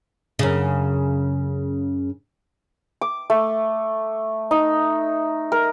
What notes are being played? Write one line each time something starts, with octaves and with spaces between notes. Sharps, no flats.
F#2 C#3
D6
A3
D#4
A#4